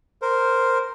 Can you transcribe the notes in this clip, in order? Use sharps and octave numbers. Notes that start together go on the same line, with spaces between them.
A#4 C5